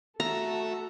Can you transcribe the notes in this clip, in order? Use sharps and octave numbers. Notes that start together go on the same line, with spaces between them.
A3 F#4 A4 E5 A#5